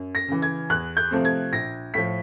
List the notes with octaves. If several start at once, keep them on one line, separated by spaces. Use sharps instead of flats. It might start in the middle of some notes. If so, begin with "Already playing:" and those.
Already playing: F#2
A#6
C#3 E3
G#6
E2 F#6
G6
C3 F3 A3 C4
G#6
A#1 A#6
A2 F3 B6